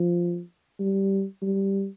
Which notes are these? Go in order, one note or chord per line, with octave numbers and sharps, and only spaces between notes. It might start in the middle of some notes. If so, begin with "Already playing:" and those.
Already playing: F3
G3
G3